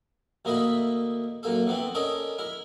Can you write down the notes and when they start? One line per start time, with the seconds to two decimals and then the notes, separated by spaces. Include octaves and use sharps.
0.45 D2 A#3 E4 D#5 E5 B5
1.43 F#2 A#3 A4
1.67 E3 B3 C4
1.95 C#4 A4 A#4 D5 D#5
2.38 E4 A#4